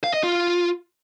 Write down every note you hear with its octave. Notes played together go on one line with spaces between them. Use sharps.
F5
D#5
F4